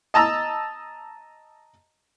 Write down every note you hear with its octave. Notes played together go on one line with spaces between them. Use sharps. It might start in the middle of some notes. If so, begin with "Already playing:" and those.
D#5 A5 A#5 E6